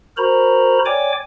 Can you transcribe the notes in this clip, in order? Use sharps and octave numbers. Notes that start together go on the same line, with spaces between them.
F#4 A#4 C5 A#5 B5
C#5 D5 G5 G#5 D6